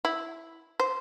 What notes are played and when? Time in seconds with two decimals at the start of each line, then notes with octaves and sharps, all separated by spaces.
0.05 E4
0.80 C5